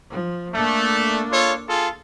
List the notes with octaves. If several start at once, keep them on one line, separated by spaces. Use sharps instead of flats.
F3
A3 A#3 D4
F4 A4 C#5
F4 G#4 A4